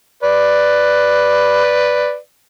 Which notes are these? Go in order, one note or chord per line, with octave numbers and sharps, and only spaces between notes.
B4 D5